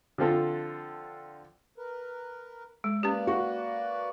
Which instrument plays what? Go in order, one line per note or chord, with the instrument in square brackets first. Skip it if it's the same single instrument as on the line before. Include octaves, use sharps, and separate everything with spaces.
[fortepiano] D3 F3 C4 F4 A4
[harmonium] A#4 B4
[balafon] G#3
[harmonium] A#3 B4 D5 [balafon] C#4 G4
[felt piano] F#4